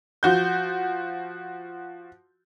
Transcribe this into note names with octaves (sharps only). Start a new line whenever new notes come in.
F3 F#4 G6